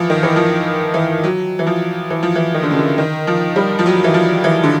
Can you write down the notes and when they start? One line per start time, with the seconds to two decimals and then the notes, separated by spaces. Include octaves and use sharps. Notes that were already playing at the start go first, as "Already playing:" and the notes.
Already playing: E3 F3
0.10 D#3
0.23 E3
0.36 F3
0.94 E3
1.23 F#3
1.59 E3
1.67 F3
2.10 E3
2.23 F3
2.35 E3
2.54 D#3
2.63 D3
2.71 C#3
2.79 D3
2.98 D#3
3.27 F3
3.56 G3
3.79 F3
3.86 F#3
4.04 E3
4.14 F3
4.44 E3
4.63 D3